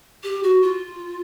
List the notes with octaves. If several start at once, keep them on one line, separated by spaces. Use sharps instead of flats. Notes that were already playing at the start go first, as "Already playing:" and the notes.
G4
F#4
F4